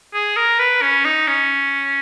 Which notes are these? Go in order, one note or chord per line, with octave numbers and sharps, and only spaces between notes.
G#4
A#4
B4
C#4
D#4
C#4